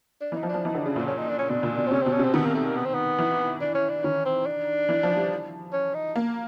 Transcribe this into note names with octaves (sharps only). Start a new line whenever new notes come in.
D4
E3 D#4
F3
D4
F3
E3 D#4
D3
C#3 D4
A#2 D4
C#4
D#4
D4
C#4
B2 D4
A#2
B2
C4
C3 C#4
B2 C4
C#4
C3 C4
D#3 B3
A#3
A3
A#3
B3
C4
B3
E3
D4
C#4
D4
D#3 C#4
C4
D4
E3
F3
G3
C#4
D#4
A#3